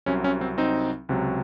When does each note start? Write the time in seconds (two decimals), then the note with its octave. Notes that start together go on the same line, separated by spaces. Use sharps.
0.06 C2 C3 F#3 C#4
0.24 C#4
0.41 C4
0.58 C4 D#4
1.09 C#2 C3 F#3